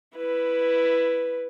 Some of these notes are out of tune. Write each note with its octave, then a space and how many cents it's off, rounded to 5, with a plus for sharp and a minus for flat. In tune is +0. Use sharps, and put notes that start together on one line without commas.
E4 +10 B4 +0